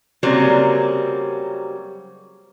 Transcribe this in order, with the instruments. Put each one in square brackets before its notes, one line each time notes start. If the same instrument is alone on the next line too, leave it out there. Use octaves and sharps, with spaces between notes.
[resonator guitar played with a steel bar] C#3 F#3 G3 A#3 C4